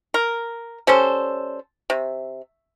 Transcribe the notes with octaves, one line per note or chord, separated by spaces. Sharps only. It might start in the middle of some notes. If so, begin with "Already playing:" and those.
A#4
G3 C#4 A4 C5
C3